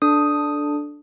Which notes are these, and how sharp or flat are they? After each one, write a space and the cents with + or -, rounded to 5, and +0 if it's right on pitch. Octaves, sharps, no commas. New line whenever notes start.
D4 +0 A4 -10 D#6 +0